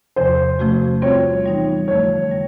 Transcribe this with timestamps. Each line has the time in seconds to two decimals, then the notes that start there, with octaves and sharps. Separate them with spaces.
0.16 E2 C3 F3 C5
0.59 C3 F3 A3 C#4 F#4
1.02 G3 C4 F4 C#5
1.46 E3 G3 B3 D#4
1.88 F2 D3 F3 A3 C#5
2.31 G3 B3